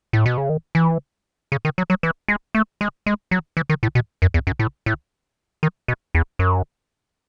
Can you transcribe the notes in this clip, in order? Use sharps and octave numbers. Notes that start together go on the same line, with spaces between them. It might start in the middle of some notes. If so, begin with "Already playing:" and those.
A2
B2
C#3
D#3
E3
C#3
D#3
F#3
F#3
E3
G#3
A3
G#3
G#3
F#3
E3
D#3
A2
B2
F#2
E2
F#2
A2
A2
D#3
B2
E2
F#2